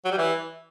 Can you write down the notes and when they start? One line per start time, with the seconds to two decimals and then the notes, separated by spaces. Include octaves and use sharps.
0.05 F#3
0.11 G3
0.18 E3